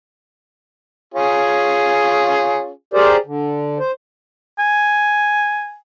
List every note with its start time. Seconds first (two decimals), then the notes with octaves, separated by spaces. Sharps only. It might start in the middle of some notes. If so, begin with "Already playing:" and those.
1.14 C#4 F4 G#4
2.94 G4 G#4 A#4 C5 D5
3.26 D3
3.79 C5
4.60 G#5